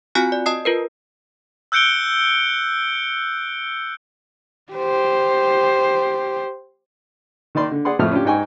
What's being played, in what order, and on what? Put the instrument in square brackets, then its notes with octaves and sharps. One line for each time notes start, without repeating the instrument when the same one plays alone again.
[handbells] C4 F4 F#4 G#5 F#6 C#7
D5
D#5 A5 D#6 C7
F4 A#4 B4
[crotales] E6 F#6 G6 C#7 D7 G7
[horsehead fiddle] G4 C5
[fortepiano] D#3 D#4 D5 C6
D3
G#4 D5 F#5 C6
F2 A2 F3 A3 E5 F6
C#4 D4 F4 G4
G#2 D#4 G5 G#5 C#6